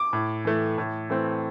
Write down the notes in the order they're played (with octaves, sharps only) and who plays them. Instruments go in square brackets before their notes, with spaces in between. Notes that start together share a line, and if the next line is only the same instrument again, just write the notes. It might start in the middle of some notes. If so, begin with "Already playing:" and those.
Already playing: [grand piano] D6
A2
E3 A3
A2
E3 A3 C4